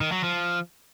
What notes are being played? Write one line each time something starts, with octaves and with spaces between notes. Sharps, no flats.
D#3
F#3
F3